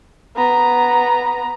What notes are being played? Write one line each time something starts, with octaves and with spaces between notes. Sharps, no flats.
B3 A#5